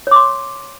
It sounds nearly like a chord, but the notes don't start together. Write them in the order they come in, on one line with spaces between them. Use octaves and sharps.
C#5 D6 C6